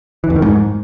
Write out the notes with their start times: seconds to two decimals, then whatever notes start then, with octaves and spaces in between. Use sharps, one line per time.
0.24 E3
0.30 F2
0.36 D#3
0.42 G#2